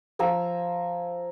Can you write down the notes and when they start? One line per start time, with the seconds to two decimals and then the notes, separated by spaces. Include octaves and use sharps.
0.19 F3 G#5 A#5 E6